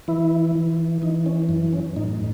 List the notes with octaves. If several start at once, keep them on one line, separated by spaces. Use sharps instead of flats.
E3 E4
E3
E3 D#4
C#4
F#2
C#4
A2 D#4